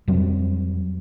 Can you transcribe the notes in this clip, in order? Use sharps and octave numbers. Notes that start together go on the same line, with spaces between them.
F2 F#3 G3 C4